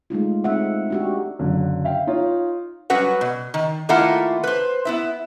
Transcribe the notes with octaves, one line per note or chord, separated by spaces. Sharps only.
G#3 A3 D#4 F4
C4 D#4 E5 F#5
D4 F#4 G4
F#1 D3 F#3
E5 F5 G5
D#4 F4 C#5
F#3 G3 C#4 F#4 B4 F#5
B2
D#3
D#3 A3 A#3 E4 F4 F#5
B4 C5
B3 E4 E5